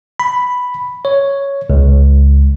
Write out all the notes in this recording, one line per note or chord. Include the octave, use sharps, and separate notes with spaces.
B5
C#5
C#2